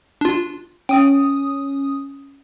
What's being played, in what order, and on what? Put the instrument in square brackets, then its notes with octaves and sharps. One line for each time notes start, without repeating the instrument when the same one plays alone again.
[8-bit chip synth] D4 F4
[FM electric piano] C#4 D#6 [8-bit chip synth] G5